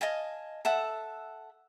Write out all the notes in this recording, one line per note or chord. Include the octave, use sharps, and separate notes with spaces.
D#5 F5 G#5 A5
A4 E5 F#5